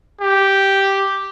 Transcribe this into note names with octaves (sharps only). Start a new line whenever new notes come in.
G4